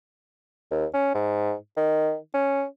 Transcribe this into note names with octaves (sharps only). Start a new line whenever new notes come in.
D#2
C#4
G#2
D#3
C#4